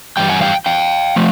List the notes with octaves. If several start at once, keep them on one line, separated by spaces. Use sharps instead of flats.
G2 E3 G3 G5
F#5 G#5
F5 G5
F5 G5
F3 A3